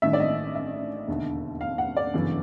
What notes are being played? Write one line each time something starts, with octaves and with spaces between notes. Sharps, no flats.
A1 G2 D#3 E5
D5
D#5
E5
E1 D#2 D3
F5
F#5
D5
G1 F#2 C#3 E3